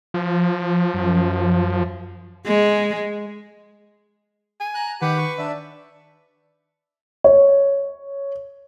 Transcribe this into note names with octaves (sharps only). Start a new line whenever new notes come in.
F3
F#2
G#3
G#5
A#5 F#6
D#3 G4 B4 F#5
C#6
D4 D5 E5
C#5